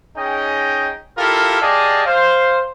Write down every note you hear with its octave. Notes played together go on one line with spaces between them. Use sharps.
C#4 D#4 G#4 D#5 G5
E4 F4 G4 A4 A#4 F5
G4 G#4 D5 D#5 F5 A5
C5 F5